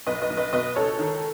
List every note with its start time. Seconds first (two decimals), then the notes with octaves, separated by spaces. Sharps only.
0.07 B1 B4 D#5
0.22 B4 D#5
0.30 B1
0.37 B4 D#5
0.53 B2 B4 D#5
0.75 C#2 A4 C#5
0.99 D#3